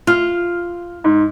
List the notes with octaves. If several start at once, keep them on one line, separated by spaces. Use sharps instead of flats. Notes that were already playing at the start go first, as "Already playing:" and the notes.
F4 F6
G#2